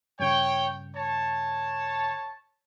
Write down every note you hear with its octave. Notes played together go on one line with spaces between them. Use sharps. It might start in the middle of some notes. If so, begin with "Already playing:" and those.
G2 C#3 C#5 G5
C#5 A5